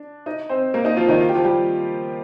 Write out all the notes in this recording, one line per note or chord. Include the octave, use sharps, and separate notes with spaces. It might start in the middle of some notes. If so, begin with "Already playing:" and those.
Already playing: D4
D#4 D#5
C4 C5
A#3 A#4
D#4 D#5
F3 F4
D#3 D#4
F4
G4
F3 F4
G3 G4